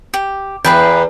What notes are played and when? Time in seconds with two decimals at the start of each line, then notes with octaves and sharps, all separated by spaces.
0.14 G4
0.64 E2 G#4 B4 G5